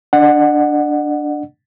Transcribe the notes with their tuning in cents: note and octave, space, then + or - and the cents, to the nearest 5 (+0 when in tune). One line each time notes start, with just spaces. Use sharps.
D4 +0 D5 +45 F#5 +0